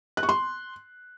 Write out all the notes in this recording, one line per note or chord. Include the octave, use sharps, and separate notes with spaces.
F#6
C#6
C6